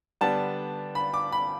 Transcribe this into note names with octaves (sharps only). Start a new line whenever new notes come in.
D3 G3 B3 D4 A5
B5
D6
B5